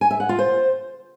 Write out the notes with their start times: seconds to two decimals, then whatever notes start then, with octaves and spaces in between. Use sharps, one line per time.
0.01 G#5
0.11 E5
0.20 F#5
0.29 F4
0.39 C5